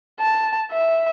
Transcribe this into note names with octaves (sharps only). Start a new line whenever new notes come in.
A5
E5